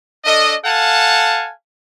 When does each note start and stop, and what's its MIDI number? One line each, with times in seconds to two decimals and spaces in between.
0.25 0.55 62
0.25 0.55 69
0.25 0.55 75
0.65 1.51 69
0.65 1.51 77
0.65 1.51 78
0.65 1.51 80
0.65 1.51 81